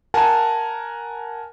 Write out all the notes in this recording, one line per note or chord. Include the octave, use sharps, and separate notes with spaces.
A#4 F#5 G#5 A5